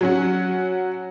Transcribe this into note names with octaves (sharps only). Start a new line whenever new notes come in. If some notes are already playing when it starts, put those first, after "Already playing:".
F#3 C#4 F#4